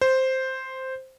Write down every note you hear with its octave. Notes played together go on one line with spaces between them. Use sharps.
C5